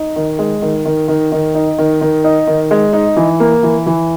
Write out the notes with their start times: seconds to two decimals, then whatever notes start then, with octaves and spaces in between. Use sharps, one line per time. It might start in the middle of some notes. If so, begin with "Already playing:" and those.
Already playing: D#4
0.16 D#3
0.39 G#3
0.62 D#3
0.85 D#3
1.08 D#3
1.32 D#3
1.55 D#4
1.78 D#3
2.01 D#3
2.24 D#4
2.47 D#3
2.71 G#3
2.93 D#4
3.16 E3
3.40 A#3
3.63 E3
3.86 E3